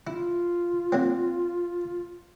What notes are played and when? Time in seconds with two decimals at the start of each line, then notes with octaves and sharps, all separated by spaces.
0.07 E4 F4
0.92 F#3 A#3 C4